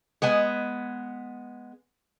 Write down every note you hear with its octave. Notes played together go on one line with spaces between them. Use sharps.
G#3 B3 G#5